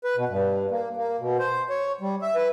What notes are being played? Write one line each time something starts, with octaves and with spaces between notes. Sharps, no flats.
B4
B2
G2
A#3
A#3
B2
C5
C#5
G3
E5
B4